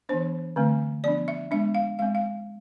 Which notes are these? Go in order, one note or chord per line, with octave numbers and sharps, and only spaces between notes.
E3 B3 D4 C5
D3 A3 C4
F3 B3 D4 D5
E5
G#3 B3 D4 E5
F5
G#3 C4 F5
F5